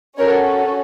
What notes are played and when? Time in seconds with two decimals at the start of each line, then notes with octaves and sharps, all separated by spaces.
0.17 C#4 F#4 A4 A#4 C#5